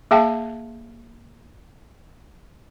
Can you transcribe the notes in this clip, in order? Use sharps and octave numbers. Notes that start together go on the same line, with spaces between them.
A#3 G#4 E5 F5 G5 A5